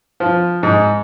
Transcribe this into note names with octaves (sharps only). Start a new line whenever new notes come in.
F3
G#2